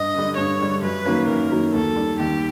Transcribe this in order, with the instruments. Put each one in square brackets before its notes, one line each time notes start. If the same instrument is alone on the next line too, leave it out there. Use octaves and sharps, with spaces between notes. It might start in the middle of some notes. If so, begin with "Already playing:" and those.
Already playing: [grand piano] G2 [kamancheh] D#5
[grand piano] D3 G3
[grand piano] G2 [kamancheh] C#5
[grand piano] D3 G3
[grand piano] F#2 [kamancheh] B4
[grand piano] D#3 F#3 A#3 C#4
[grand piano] F#2 [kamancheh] A#4
[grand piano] D#3 F#3 A#3 C#4
[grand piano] D#2 [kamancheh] A4
[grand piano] D#3 G3
[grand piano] D#2 [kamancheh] G4